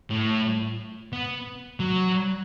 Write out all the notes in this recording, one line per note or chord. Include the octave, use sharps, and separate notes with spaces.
A2
B3
F#3